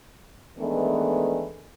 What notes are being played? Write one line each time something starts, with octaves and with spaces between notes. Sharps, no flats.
D#3 E3 G#3 A3 B3 D4